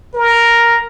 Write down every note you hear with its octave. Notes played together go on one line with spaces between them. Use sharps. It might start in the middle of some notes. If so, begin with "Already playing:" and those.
A#4